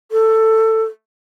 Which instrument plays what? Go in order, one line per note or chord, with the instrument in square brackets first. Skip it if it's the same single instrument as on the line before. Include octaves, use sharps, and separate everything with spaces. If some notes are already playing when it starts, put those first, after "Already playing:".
[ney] A4